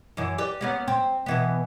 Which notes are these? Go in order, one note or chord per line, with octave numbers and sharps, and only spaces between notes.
F#2 E3
G4 B4 D5
A#3 B3 C#4
C4
B2 E3 B3